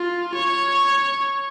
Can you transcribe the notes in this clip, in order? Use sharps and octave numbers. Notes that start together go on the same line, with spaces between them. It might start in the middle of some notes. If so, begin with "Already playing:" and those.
Already playing: F4
C#5